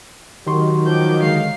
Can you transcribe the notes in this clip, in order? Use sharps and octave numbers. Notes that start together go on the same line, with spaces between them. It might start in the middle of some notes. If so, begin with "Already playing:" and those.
D#3 F#3 G4 C6 C#6
F3 D6 G6
D3 G#3 F5 C7